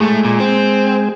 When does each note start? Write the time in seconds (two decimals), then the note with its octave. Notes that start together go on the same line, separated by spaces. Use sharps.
0.01 A2 G#3 A3 G#4
0.25 A#2
0.40 C4